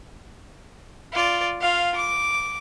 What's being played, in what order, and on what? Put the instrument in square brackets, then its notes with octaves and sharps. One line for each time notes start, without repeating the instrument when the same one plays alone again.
[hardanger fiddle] F4 D5
F4 F5
D6